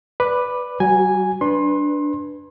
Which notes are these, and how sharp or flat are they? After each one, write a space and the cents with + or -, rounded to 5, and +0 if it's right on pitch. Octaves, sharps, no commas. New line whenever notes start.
B4 +0 D5 -10 D6 +10
G3 -45 F#4 +0 G#5 -5
D4 +0 B4 +0 C6 +30